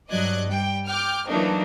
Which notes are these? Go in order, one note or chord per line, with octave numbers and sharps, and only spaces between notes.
G2 F#3 D5 D#5 F#6 G#6
G3 G5
G5 D6 F6 G6
E3 F#3 A3 A#3 D4 D#4